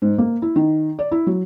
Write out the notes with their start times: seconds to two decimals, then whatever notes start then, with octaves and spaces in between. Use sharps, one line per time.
0.02 G#2
0.18 A#3
0.42 E4
0.56 D#3
0.99 D5
1.11 E4
1.27 F#3